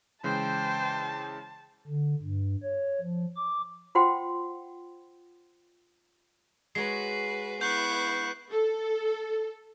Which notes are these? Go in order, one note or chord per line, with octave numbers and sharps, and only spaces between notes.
C#3 E3 G#3 C5 G5 A5
D3
G2
C#5
F3
D6
F4 C5 F#5 G5 C6
G#3 F#4 B4 C#5 C7
B3 E4 C#6 F#6 G6 C7
A4